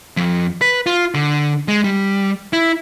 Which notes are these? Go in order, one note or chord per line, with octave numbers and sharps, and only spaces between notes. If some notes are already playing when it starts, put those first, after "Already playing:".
F2
B4
F4
D3
G#3
G3
E4